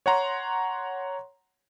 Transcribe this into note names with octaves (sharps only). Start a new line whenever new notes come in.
C#5 F#5 A#5 C6